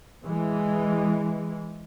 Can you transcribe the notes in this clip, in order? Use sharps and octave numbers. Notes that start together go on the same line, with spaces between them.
E3 G#3